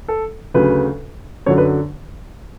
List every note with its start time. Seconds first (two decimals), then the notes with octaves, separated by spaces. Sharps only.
0.08 A4
0.54 D2 C#3 F#3 B4
1.46 F#2 D3 F#3 C#5
1.58 B4